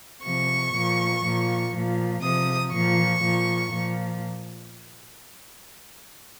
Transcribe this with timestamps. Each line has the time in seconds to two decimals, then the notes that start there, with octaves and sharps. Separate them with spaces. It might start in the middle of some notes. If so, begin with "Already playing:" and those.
0.23 C3 F3 C#6
0.74 A#2 F3
1.23 A#2 F3
1.72 A#2 F3
2.22 C3 F3 D#6
2.72 A#2 F3 C#6
3.22 A#2 F3
3.72 A#2 F3